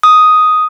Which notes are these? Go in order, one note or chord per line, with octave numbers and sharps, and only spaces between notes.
D#6